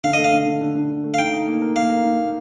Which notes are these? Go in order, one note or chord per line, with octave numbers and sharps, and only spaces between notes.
D3 F5
A3 D#5
F5
D3
D3
D3
D3
D3
A3
F5
D#4 G5
D#4
A#3
A#4
A#3 F5
A#4
D#4
A#3